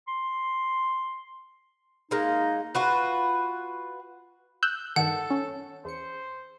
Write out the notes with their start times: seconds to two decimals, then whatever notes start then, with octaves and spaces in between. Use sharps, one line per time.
0.08 C6
2.11 G#3 A#3 D#4
2.75 F4 F#4 B4
4.63 E6 F#6 G6
4.96 G2 D#3 A4 F#5
5.30 C#4
5.85 E2 C5 C#7